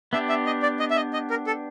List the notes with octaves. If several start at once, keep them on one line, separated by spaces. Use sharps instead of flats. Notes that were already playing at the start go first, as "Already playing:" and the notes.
B3 D4 G4 E5
E5
D#5
D5
D#5
E5
D#5
D#5
A#4
A4